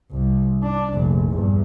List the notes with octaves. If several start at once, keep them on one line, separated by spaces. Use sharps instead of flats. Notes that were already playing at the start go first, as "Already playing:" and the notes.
C2
D4
F1 A#1
E2 G2